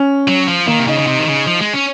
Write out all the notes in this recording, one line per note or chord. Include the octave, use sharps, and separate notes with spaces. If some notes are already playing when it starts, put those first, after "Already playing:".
Already playing: C#4
F#3
F3
D#3 A#3
C3
C#3 D#4
C#3
C3
D#3
C#3
F3
G#3
C#4